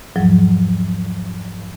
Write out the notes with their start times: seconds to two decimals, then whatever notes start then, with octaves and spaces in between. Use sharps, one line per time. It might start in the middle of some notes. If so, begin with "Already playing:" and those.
0.16 E2 G#2 F3 F#3